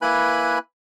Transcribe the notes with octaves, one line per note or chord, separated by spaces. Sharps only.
A#3 E4 B4 G#5 B5 F#6